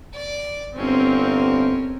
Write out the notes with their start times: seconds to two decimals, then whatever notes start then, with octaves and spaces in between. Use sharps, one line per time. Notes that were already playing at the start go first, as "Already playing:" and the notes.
0.14 D5 D6
0.77 G1 C4 C#4 A#4